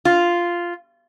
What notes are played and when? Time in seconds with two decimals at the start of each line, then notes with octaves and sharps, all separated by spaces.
0.05 F4